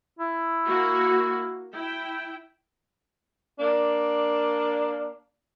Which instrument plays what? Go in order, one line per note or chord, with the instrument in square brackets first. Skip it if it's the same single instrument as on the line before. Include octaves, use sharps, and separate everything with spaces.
[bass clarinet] E4
[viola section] A#3 F#4
E4 G5
[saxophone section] A#3 D4